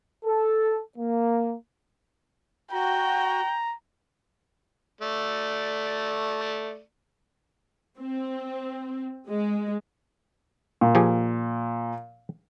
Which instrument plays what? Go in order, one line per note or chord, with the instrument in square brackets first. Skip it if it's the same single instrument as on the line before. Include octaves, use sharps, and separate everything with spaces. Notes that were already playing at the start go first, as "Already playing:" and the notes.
[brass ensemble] A4
A#3
[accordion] F#4 [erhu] G5 [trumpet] A#5
[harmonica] A3 D5
[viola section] C4
G#3
[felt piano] A#2
[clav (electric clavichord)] F3 G4 G#4